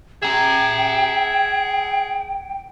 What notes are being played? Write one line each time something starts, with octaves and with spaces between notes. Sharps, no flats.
G#4 E5 G5 A#5